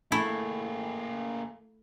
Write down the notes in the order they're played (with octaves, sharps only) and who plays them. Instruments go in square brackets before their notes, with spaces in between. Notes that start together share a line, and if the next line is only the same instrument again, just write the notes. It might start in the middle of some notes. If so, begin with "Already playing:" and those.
[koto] A3 E4 [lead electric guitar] A#3 G#4